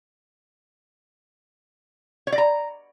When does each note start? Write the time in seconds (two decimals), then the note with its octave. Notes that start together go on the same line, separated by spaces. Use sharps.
2.27 C#5
2.32 D5
2.38 A#5